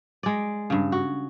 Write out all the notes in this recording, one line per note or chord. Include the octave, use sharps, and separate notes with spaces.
G#3 D5
G2 C#3
F#4